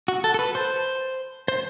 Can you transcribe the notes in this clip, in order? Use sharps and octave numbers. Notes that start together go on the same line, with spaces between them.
F#4
A4
A4
B4
C5
C5